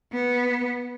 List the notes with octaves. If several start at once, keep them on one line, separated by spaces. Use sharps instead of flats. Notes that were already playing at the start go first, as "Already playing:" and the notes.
B3